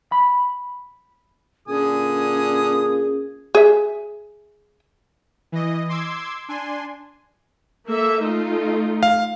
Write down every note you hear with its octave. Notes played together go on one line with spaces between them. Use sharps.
B5
A#2 D3 C#4 G#4 G#5 D#6
G#4 E5
E3 D#5
C6 D6 E6 G#6
D4 G#5 C6
A#3 A4 E5
A3 D#4 F4
F5